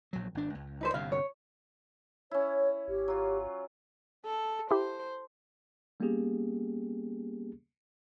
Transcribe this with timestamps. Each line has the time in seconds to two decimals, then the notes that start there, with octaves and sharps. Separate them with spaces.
0.13 A#1 F#3
0.35 G#1 D4
0.55 C#2
0.81 D#4 B4 C5
0.94 G1 G2 C3 F5
1.12 C#5
2.31 C#4 E4 C#5
2.88 G#1 G4
3.08 F#3 F4
4.25 A4
4.71 E4 G4 C5
6.00 G3 A#3 B3 C#4 G4 G#4